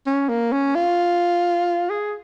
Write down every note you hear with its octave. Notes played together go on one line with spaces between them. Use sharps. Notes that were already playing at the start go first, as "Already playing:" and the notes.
C#4
A#3
C#4
F4
G#4